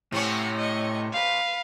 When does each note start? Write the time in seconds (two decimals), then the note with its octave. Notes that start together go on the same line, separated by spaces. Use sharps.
0.12 A2 C3 C4 C#4 F#5 C#6
0.56 D#5 C#6
1.13 B4 F5 C6